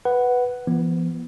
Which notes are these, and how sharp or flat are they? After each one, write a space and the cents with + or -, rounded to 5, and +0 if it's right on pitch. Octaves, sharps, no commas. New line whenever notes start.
B4 +0 F#5 +5
F3 -45 B3 -25